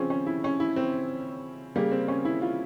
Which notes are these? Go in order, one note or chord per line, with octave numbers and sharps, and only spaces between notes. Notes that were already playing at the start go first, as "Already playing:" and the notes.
Already playing: C#3 F3 C4 C#4
C#4
E4
C#4
E4
C4
C#3 G3 A#3
C4
C#4
E4
F4